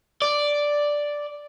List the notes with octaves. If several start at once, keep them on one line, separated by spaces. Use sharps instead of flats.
D5